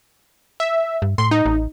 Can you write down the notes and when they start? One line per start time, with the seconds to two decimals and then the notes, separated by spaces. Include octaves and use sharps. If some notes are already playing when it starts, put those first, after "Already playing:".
0.60 E5
1.02 G2
1.18 A2 C6
1.31 D#4
1.46 A1